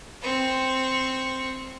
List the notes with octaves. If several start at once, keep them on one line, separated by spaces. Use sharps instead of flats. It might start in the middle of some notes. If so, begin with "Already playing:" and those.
C4 C#6